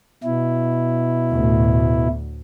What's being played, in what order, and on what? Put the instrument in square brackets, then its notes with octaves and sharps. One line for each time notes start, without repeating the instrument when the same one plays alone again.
[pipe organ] B2 E4
[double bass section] D2 A2